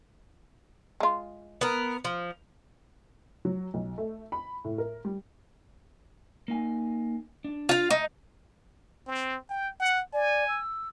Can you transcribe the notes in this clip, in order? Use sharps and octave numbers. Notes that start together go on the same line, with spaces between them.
G#3 F4
B3 A#4
F3
F#3
B1
A3
B5
A2
A#4
G3
A#3 D#4 G#5
D4
F4 F5
A3 D#4 E5
C4
G5
F#5
D5 G#5
E6